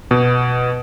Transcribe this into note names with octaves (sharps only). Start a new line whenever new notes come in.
B2